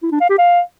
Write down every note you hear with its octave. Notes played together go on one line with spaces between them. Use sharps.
E4
D4
F5
G4
F5